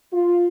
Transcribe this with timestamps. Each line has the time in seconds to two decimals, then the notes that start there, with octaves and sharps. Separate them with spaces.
0.13 F4